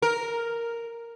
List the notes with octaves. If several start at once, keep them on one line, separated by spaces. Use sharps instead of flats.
A#4